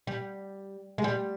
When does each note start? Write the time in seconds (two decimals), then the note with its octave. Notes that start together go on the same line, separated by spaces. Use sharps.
0.07 G3
0.98 G#3
1.04 G3